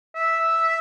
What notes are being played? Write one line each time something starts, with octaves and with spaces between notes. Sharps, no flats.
E5